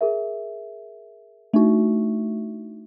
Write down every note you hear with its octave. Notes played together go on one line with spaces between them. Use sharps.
G#4 A#4 E5
A3 D4 D#4 F#4